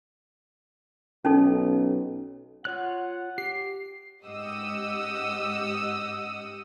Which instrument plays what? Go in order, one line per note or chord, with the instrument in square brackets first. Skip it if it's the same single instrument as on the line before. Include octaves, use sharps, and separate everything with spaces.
[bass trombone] B1 [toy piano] C#4 D#4 A4
[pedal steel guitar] F4 C#5 F#6 [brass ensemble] F#5
[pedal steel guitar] G4 [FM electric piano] C7
[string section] G#2 G4 D#5 F#5 D#6 E6